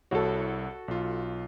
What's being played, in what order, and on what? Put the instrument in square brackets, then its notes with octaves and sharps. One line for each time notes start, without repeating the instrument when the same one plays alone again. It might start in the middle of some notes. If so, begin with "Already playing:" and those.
[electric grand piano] C2 E4 C#5 [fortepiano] F#4 A4
[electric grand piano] B1 F4